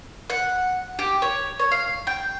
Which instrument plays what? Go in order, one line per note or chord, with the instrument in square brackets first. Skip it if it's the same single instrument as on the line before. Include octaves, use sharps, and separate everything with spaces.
[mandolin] F#5
G4
C#5
C#5
F5
G5